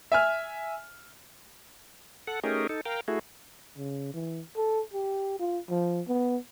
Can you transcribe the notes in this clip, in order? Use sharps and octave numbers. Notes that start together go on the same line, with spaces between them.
E5 G#5 F6
A4 F#5
A3 C#4 D#4 G4 G#4 A#4
D#4 A4
A#4 F5 G5
A3 E4 F#4 G#4
C#3
E3
A4
G4
F4
F3
B3